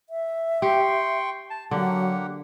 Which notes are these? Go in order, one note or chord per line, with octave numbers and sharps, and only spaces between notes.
E5
G4 G5 C6 C#6
A5
D3 F#3 A#3 G4 F#5